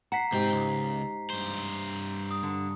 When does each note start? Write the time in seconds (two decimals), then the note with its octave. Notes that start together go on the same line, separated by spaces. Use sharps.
0.12 F#5 A#5 B6 C7
0.32 G#2 C3 G4 G5
0.52 C#2
1.30 G2 C5
2.31 D#6
2.43 D3